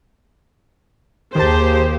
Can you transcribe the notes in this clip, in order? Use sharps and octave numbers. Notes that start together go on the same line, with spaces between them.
D#2 D#3 G4 G#4 C5 A5